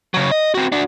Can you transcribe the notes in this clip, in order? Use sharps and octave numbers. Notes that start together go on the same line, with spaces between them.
C#3 F#3
D#5
C4 F#4
D4 F#4